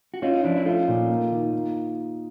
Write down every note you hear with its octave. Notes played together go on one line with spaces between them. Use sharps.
F#4
C#4 D#4 F4
D#4
F3 D4 E4
E4
A3 D#4 F4
A#2
A#3
D#3
A#3